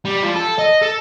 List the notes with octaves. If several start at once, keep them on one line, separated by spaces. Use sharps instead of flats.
G3
F3
A4
D#5
A4